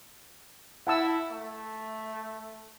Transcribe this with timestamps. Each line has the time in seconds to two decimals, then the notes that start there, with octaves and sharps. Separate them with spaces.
0.87 E4 F#5 A5 E6
1.31 A3